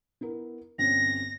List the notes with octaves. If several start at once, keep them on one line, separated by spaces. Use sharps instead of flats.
B3 E4 A#4
G1 C4 C#4 A#6